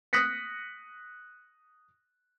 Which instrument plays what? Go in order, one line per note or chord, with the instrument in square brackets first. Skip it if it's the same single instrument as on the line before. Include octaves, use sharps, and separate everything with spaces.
[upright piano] D#6 F#6 A#6 B6 C#7